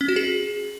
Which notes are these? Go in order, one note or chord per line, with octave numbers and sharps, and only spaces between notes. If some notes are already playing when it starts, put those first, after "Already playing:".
C#4
F#4
G#4